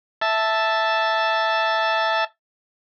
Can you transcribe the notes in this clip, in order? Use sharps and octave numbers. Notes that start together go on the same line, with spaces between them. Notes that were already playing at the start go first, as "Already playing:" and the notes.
E5 A5